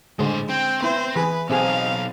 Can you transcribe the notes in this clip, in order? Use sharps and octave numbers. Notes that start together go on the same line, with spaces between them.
A2 D3 G#3 C5
C4 G5
B3 E4 C5
E3 G#4 B4
B1 C4 G#4 F5